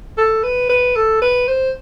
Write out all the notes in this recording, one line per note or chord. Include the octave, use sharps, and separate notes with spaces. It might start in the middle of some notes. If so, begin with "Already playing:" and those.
A4
B4
B4
A4
B4
C5